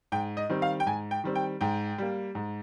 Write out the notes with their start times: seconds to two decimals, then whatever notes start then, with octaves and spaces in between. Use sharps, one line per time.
0.12 G#2 G5
0.37 D#5
0.49 D#3 G3 C4
0.62 F5
0.80 G5
0.86 G#2 G#5
1.11 G5
1.24 D#3 G3 C4
1.35 G5
1.61 G#2 G5
1.98 G3 A#3
2.35 G#2